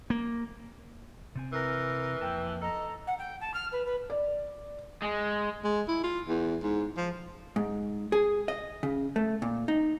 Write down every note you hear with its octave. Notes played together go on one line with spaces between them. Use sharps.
A#3
C3 C4 G#5
E3 A#4
F2 A#3 G5 A5
A4 D#5 A#5
F#5
G5
A5
F6
B4
B4
D5
G#3
G#3
E4
F4
E2
G#2
F3
G#2
G#4
D#5
C#3
A3
A#2
D#4